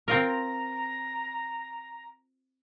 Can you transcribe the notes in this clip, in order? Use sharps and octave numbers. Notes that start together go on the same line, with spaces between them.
C4 F4 A#4 A#5